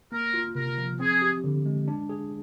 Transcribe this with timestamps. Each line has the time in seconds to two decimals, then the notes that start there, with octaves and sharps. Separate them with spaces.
0.12 A#3 A#4
0.34 F4
0.55 C3 A#4
0.78 F3
0.99 C4 G#4
1.22 G4
1.44 D3
1.66 G#3
1.88 D4
2.09 G#4